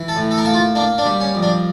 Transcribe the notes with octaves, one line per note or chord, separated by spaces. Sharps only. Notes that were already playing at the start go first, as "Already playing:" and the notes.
Already playing: E3
A4
A2
A4
A#4
A#3 A4
F4
A#3 D4
D4
G3
C#4
F2
D4